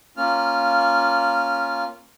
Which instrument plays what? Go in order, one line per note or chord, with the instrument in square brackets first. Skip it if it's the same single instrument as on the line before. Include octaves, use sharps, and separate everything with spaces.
[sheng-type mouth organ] A#3 C#4 F4 F6